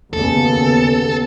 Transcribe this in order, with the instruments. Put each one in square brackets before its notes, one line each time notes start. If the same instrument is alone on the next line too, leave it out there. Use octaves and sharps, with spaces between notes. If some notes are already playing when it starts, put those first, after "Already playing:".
[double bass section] D#2 C#3 B3 [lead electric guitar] A4